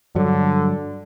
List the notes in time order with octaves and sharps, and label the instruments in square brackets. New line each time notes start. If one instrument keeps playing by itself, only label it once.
[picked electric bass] G2 F#3 [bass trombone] D3